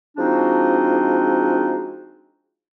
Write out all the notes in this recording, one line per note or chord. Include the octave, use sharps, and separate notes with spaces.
F3 G#3 C4 D4 D#4 F#4